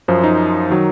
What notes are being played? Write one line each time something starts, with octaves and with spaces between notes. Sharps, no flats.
F#2 F3 C5
D#4
D#3 F#3